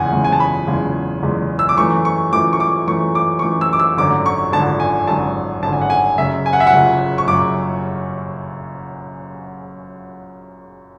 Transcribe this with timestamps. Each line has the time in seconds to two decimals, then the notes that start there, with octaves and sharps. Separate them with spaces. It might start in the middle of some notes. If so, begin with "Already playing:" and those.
Already playing: F#1 E2 C#3 G#3 F#5 G#5
0.12 F#1 E2 C#3 G#3
0.24 G#5
0.32 A5
0.40 B5
0.67 F#1 E2 C#3 G#3
1.23 F#1 E2 C#3 G#3
1.59 E6
1.69 D6
1.77 F#2 E3 A3 C#6
2.05 C#6
2.32 F#2 E3 A3 D6
2.53 C#6
2.60 D6
2.87 F#2 E3 A3 C#6
3.15 D6
3.39 C#6
3.42 F#2 E3 A3 D6
3.61 E6
3.73 D6
3.79 E6
3.97 G#1 F#2 D3 D6
4.26 C#6
4.52 G#1 F#2 D3 A5
4.80 G#5
5.07 G#1 F#2 D3 A5
5.62 G#1 F#2 D3 A5
5.73 G#5
5.81 F#5
5.90 G#5
6.18 F#1 F#2 C#3 E5
6.46 G#5
6.53 F#5
6.60 E5
6.67 F#5
6.74 F#1 F#2 C#3
7.18 C#6
7.27 F#1 F#2 C#3 D6